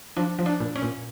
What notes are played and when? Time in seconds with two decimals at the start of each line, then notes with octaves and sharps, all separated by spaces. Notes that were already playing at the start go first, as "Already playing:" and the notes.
0.17 F3 D4
0.39 F3
0.46 D4
0.60 A#2
0.76 C#4
0.82 A#2